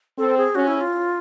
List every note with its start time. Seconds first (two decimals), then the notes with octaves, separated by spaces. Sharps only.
0.18 C4 A4
0.38 G#4
0.55 C#4 F#4
0.68 E4
0.81 F4